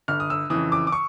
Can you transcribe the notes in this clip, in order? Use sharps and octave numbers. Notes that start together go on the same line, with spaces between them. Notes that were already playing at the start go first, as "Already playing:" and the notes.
G1 F6
D#6
E6
F2 C#3 E3 D#6
D6
D6
C#6